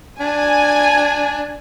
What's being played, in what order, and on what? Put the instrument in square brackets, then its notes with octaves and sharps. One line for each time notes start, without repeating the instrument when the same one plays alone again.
[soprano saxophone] D4 [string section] G#5